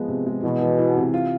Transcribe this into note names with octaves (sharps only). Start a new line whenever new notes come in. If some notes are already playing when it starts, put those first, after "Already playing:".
Already playing: F3 G#3 B3
C3
G#3
B2 E3
E3
E3
C3
F4